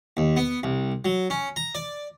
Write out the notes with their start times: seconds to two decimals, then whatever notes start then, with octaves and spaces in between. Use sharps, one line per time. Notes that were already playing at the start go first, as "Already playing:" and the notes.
0.17 D#2
0.37 B3
0.63 C2
1.05 F#3
1.30 C#4
1.56 A#5
1.75 D5